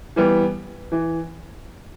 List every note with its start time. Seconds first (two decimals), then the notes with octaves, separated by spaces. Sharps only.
0.16 E3 G3 B3
0.92 E3